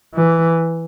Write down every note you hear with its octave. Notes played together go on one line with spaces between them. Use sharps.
E3